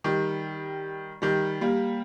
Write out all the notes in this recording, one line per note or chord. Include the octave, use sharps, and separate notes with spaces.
D#3 G3
D#3 G3
G3 A#3